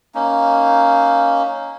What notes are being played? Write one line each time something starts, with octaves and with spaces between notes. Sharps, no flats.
A#3 C#4 D#4